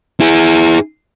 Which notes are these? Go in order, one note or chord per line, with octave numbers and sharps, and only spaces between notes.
E4 G#4